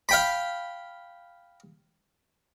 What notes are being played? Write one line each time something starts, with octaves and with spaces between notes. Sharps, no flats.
F5 G5 B5